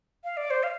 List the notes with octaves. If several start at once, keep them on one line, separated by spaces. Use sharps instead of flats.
F5
D5
C5
F5